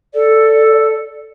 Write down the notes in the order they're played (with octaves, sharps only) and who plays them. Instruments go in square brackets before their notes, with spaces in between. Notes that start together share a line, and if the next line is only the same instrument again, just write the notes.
[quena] A4 [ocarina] D5